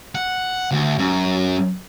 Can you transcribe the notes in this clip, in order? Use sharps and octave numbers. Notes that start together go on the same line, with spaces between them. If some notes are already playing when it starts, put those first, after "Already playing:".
F#5
D2
F#2